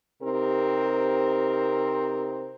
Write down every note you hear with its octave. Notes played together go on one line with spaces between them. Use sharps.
C3 C4 D#4 G4 A#4